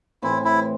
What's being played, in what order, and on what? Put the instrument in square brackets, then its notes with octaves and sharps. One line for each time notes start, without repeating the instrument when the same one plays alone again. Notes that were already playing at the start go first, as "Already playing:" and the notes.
[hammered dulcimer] A2 E3 C4 [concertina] E4
[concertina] E4